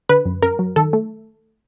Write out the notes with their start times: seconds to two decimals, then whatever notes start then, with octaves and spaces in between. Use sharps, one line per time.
0.09 D3 B4
0.25 F#2
0.43 F#2 A#4
0.59 F#3
0.76 D#3 A4
0.93 A3